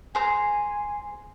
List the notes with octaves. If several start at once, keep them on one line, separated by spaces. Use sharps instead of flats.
G#4 C5 G#5 A#5